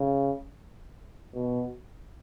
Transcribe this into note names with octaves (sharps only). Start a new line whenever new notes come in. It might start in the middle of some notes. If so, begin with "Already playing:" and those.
Already playing: C#3
B2